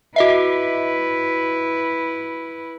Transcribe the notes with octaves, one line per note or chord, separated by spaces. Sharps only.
E4 F#4 B4 D#5 E5